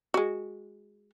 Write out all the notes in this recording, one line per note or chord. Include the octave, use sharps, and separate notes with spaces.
G#3 F#4